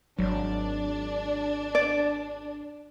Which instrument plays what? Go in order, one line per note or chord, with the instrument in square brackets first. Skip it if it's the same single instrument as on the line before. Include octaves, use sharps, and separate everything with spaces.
[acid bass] G#1 [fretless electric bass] F#3 [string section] D4
[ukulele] D5